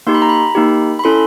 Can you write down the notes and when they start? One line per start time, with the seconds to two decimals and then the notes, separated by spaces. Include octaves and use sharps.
0.07 A#3 D#4 G4 C6
0.14 B5
0.22 A#5
0.29 B5
0.55 A#3 D#4 G4
0.99 B5
1.04 C#4 E4 A4 C6